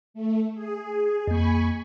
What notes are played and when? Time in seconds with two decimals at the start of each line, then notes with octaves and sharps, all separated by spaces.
0.14 A3
0.55 G#4
1.27 F2 A#3 G#5 B5 C#6